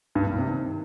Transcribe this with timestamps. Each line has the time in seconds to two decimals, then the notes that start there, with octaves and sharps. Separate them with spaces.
0.15 G2
0.27 G2
0.38 C3
0.50 D#3